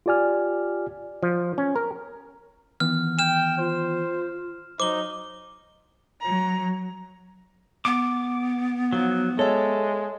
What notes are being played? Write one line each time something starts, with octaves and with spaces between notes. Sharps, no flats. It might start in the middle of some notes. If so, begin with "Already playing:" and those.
F4 G4 D5 G#5 F6
F3
C#4
A#4
D#3 E3 B3 F6
G5 F6 E7
F4 C5
F#3 D#4 C5 D6 G7
F#3 A#5
B3 D6
F3 F#3 D#4
G#3 A4 C#5 E5